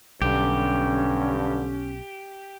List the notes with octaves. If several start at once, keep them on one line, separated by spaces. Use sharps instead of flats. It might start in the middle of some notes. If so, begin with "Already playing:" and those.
B1 G2 D3 C#4 G4